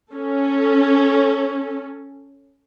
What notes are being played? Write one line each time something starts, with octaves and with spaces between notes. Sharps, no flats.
C#4 A4